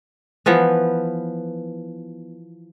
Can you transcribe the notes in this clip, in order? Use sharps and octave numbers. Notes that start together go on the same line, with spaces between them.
E3 F3 B3